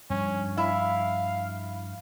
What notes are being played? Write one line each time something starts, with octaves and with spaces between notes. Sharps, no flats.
G2 F3 C#4
E4 F5